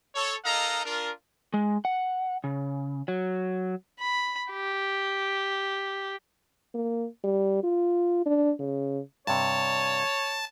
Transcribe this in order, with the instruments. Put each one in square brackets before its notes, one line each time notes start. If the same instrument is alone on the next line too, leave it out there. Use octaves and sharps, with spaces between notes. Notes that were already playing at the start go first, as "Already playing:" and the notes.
[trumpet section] A4 C#5
D#4 A4 A#4 D#5 F5 A#5
D4 F4 A#4
[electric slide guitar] G#3
F#5
C#3
F#3
[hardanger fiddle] B5
G4
[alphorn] A#3
G3
F4
D4
C#3
[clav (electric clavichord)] G2 C3 [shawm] C#5 [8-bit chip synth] A5